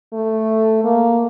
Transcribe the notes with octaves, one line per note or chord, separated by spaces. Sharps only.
A3
A#3